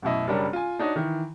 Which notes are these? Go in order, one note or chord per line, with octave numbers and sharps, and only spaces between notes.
A1 F#2 B2 E4 D#5
F#1 G3 C#4 D4 A#4 C#5
F4 G#5
D4 D#4 F#4 C#5 D#5
D#3 E3